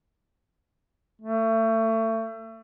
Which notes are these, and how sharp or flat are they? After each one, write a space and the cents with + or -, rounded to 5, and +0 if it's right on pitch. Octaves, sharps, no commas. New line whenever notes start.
A3 +30